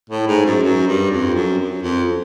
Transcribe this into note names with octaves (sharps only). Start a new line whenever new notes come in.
A2
G#2
F#2
F#2
G2
F2
F#2
F#2
F2